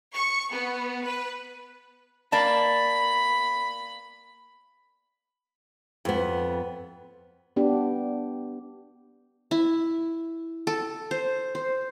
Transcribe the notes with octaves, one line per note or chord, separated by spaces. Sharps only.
C#6
B3
B4
A#3 D5 A5 B5
F2 B3
B3 D4 G4
E4
A4
C5
C5